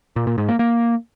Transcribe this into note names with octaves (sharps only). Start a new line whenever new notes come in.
A#2
A#2
G#2
A#3
A#3